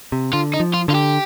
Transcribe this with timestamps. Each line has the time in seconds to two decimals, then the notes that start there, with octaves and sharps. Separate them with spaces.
0.12 C3
0.33 D3 F4
0.54 D#4
0.60 F3
0.74 F4
0.88 D3 F4
0.95 G4